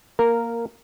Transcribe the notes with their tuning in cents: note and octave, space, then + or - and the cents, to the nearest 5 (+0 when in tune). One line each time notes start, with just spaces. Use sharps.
A#3 +0 A#4 -5